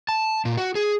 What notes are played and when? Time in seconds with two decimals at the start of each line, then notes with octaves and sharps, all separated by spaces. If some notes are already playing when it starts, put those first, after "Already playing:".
0.09 A5
0.45 A#2
0.57 F#4
0.75 G#4